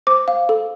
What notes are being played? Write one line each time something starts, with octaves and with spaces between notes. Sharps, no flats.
C5 D6
F5
A4